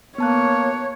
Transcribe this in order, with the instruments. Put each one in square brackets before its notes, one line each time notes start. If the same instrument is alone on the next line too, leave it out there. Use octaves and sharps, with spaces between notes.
[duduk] A#3 [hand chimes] B3 A5 F#6 [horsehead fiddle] C#5